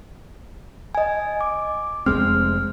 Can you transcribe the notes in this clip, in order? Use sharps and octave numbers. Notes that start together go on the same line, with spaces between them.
D#5 G#5
D6
F1 G#3 C4 F6